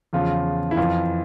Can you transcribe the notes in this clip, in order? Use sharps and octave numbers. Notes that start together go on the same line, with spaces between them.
E2 C#3 F3 F4
E4
F2 E3 F4